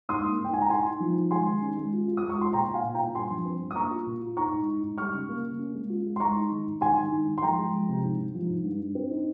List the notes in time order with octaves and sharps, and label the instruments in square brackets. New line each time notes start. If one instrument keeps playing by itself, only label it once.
[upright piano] G#2 C6 D#6
A#3
G#2
G5
D#4 G#5
A#5
D#4 G#5 C6
D#4
F3
D#4
G#3 G#5 C6
D#3
C#4
G#3
F4
F4
D#6
G#3
C#6
F4 C6
A#2 G5 A#5
A#2
F5 G#5
A#2
G5 A#5
A#2
G2 G#5 C6
F3
C4
G2
D#6
A#3 A#5 C#6
F4
A#2
F4
D#4 A#5 C#6
G#2
D#4
G#2
G3 C#6 F6
C#3
A#3
A#3
C#4
G#3
F4
G#3
C6
G#3 A#5 C#6
D#4
D#3
G#2
G#2 G#5 C6
D#3
G#2
G#2
C6
F3 G5 A#5
G#3
F3
C3
G#2
G#2
F3
G#2
G2
G2
C4
D#4